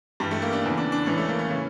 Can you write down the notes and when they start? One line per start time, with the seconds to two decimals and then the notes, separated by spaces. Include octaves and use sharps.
0.20 G2 E3 G3
0.31 A3
0.42 A#3
0.53 D4
0.63 E2 C#3 E3
0.77 D4
0.92 D4
1.06 A2 E3 C#4
1.18 A3
1.28 A#3
1.39 C#4
1.50 C#3 E3